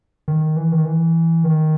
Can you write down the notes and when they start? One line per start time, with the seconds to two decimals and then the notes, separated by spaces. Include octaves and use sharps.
0.28 D#3
0.57 E3
0.72 D#3
0.85 E3
1.44 D#3